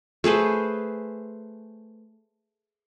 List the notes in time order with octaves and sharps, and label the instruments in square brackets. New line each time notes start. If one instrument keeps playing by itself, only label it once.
[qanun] A3 G#4 B4 C5